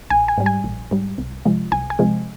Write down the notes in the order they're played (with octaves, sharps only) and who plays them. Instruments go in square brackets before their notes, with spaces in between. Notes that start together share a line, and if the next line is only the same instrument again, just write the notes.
[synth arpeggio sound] A#1 G#5
G#5
G#2 G3
G#5
A#1
G#2 G3
C2
C3 F3 G#3
C2 G#5
G#5
C3 F3 G#3